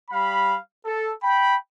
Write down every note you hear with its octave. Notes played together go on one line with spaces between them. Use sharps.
G3 F5 B5
A4
G5 B5